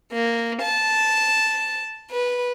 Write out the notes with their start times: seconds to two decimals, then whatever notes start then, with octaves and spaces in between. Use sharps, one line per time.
0.13 A#3
0.62 A5
2.11 B4